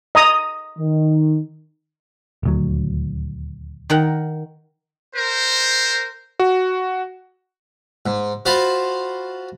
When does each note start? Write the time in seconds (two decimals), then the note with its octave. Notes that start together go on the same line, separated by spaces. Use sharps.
0.15 D#5 A#5 D#6
0.78 D#3
2.43 D#1 D2 F#3
3.90 D#3 A#4 F#5
5.15 A#4 C5
6.40 F#4
8.06 G#2
8.46 F4 F#4 C5 F5 A5 B5